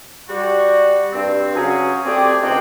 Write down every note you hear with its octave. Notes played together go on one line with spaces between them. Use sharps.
G3 F#4
G2 C4
C#3 F#3 C#4 G#4
A3 C4 G4 G#4 D5
C#2 C4 D#4 F#4 G4 G5